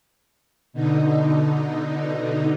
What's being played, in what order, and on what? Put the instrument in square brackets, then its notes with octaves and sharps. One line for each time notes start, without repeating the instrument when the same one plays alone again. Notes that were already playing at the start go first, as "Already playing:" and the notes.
[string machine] B2 D3 D#4